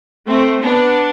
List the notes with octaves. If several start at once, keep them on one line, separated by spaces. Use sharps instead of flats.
A3 C4
B3 D4